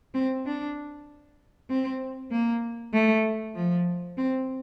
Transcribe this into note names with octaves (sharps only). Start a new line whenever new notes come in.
C4
D4
C4
A#3
A3
F3
C4